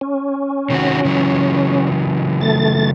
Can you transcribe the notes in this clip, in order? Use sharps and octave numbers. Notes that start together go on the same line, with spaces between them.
C#4
C3 D#3 F#4
C#3 E3 F#3
A3 A6